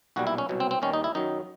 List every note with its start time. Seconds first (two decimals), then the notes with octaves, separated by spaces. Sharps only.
0.16 B1 A#2 G3 F#4
0.27 E4
0.38 C#4
0.49 C2 B2 F#3
0.60 C4
0.71 C4
0.82 D#2 D#3 G3 C#4
0.93 D#4
1.04 E4
1.15 F#2 D#3 F#3 D#4